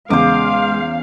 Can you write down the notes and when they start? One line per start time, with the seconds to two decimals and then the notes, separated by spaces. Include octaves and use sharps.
0.10 E2 C#3 G#3 C5 F5 D6